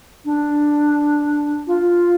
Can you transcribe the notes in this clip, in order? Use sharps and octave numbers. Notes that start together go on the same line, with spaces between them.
D4
F4